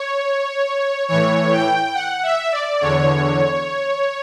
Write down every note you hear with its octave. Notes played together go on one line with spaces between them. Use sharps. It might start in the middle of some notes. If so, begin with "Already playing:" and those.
Already playing: C#5
A2 E3 C#5
G5
F#5
E5
D5
E2 D3 C#5